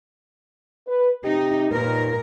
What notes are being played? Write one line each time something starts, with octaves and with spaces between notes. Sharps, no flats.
B4
C3 D#4 G4
D#2 A#2 D#4 A#4 B4